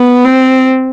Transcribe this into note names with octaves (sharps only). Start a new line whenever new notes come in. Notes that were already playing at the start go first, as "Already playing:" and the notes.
Already playing: B3
C4